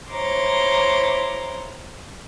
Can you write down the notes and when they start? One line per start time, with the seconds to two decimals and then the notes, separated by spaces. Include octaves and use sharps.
0.10 E4 C5 C#5 A#5 C6 D6